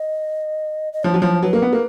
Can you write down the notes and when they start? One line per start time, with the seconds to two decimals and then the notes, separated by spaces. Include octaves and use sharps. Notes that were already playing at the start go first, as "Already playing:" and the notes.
Already playing: D#5
0.93 D#5
1.03 F3 C#5
1.14 F#3
1.22 F3
1.42 F#3 B4
1.53 A#3
1.62 B3
1.73 A#3